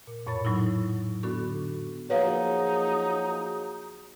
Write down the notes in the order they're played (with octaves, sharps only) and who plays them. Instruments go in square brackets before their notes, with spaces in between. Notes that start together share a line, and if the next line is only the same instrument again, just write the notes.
[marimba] A#2
F2 A2 C#5 B5 A6
A2 F#3 D#4 E4
D3 B3 D4 F#4 A4 C#6
[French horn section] F3 A#3 G#4 [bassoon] F#3 [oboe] D#4 [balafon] B4 C#5 F5